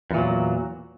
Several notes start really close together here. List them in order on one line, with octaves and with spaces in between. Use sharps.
E2 A#2 F#3